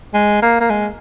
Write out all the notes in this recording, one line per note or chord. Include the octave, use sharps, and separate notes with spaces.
G#3
A#3
A#3
G#3